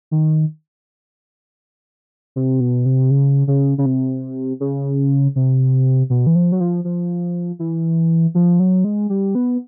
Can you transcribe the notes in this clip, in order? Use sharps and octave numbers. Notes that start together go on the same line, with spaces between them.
D#3
C3
B2
C3
C#3
C#3
C#3
C3
C#3
C3
B2
E3
F3
F#3
F3
F3
E3
F3
F#3
G#3
G3
B3